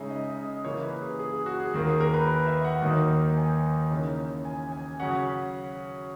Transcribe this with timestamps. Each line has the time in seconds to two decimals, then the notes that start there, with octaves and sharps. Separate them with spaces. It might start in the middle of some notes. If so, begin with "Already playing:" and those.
Already playing: C#3 G#3 D#4 E5 G#5
0.10 D#5
0.24 D#5
0.37 D#5
0.65 C#3 E3 A#3 C#5
0.83 B4
1.01 G#4
1.19 G#4
1.33 G#4
1.46 F#4
1.60 G#4
1.74 D#2 D#3 A#3 F#4
1.87 G#4
2.00 A#4
2.14 B4
2.28 B4
2.46 E5
2.65 F#5
2.82 D#2 D#3 F#3 A#3 D#4
3.37 G#5
3.91 C#3 E3 A#3 D#4
4.45 G#5
4.72 G#5
5.00 C#3 F#3 C#4 F#5